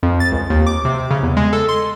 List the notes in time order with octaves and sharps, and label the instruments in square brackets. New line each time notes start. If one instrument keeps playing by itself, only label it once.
[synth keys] F2
A6
C#2
D#2
D6
C3
C#3
E2
G#3
A4
C6